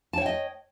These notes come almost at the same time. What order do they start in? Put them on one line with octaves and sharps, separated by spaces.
A5 C#5 G5 D#5